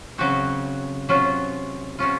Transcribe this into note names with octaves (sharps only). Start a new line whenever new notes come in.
C#3 F#3 C4 F#4
C3 F#3 C#4 F4
C3 F#3 C#4 F4